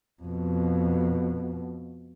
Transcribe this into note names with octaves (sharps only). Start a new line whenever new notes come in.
F2 B2